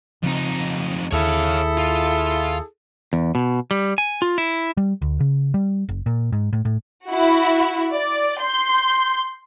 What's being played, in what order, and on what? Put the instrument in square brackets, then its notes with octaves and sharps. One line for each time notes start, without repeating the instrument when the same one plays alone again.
[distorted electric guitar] F2 D#4 [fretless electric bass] C#3 C4
[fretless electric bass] D#2 [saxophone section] E4 G#4 A4 [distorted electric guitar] C#5 F5
[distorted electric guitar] F4
[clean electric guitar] E2
B2
G3
G#5
F4
E4
[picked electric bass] G3
D2
C#3
G3
F#1
A#2
G#2
A2
A2
[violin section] E4 F#4
D5
C6 G6